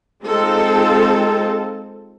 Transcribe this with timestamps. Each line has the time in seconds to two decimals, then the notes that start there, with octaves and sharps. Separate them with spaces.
0.24 G#3 C4 D#4 F4 A4